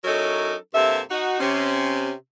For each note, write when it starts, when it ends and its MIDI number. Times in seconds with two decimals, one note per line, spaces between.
0.05 0.55 54
0.05 0.55 61
0.05 0.55 63
0.05 0.55 64
0.05 0.55 69
0.05 0.55 70
0.74 1.00 43
0.74 1.00 48
0.74 1.00 58
0.74 1.00 69
0.74 1.00 76
1.10 1.39 63
1.10 1.39 66
1.40 2.11 48
1.40 2.11 61